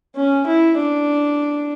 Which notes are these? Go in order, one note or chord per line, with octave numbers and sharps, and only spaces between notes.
C#4
E4
D4